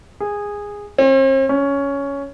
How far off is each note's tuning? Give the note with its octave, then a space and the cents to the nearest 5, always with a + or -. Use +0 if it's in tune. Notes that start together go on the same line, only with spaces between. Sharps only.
G#4 -15
C4 +45
C#4 +10